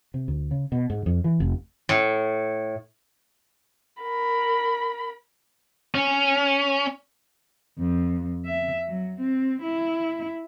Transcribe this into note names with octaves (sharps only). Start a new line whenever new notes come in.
C3
D2
C#3
B2
G#2
F2
E3
F1
A2
A#4 B5
C#4
F2
E5
F#3
C4
E4